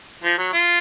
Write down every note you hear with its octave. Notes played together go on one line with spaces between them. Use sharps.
F3
F#3
F4